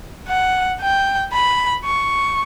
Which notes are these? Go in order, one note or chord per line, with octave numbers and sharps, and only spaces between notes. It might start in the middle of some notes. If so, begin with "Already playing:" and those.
F#5
G5
B5
C#6